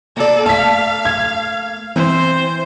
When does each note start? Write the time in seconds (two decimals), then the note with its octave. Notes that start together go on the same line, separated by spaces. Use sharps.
0.17 A#3 A4 D5
0.46 A3 A#3 F5 A5 B6
1.05 G#6
1.96 E3 C4 C5